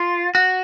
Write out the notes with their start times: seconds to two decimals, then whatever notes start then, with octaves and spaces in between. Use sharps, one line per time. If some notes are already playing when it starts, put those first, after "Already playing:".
Already playing: F4
0.35 F#4